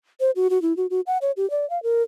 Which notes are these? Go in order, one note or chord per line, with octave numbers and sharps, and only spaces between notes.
C5
F#4
F#4
E4
F#4
F#4
F#5
C#5
G4
D5
F5
A#4